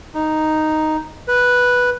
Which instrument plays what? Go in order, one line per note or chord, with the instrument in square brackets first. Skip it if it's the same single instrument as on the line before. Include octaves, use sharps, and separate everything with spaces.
[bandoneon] D#4
B4